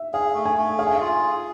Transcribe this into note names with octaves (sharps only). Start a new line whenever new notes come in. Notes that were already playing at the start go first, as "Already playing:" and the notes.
Already playing: E5
G#4 F5
A3
G#5
A3
G#4 F5
G#5
F5
F4
G#4